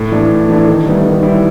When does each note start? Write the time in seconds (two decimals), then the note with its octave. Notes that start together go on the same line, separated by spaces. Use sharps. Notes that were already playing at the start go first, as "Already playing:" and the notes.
Already playing: A2
0.12 E3 A3 D4
0.31 A2
0.49 E3 A3 D4
0.67 D#3
0.86 G3 B3 E4
1.05 D#3
1.22 G3 B3 E4